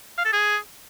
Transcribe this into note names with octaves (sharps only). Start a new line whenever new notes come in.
F5
A4
G#4